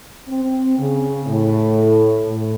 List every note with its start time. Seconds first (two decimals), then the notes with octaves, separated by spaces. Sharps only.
0.28 C4
0.78 C#3
1.27 A2
2.27 A2